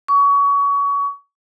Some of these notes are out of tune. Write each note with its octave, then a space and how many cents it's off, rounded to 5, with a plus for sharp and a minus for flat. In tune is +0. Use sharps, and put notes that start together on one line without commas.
C#6 +30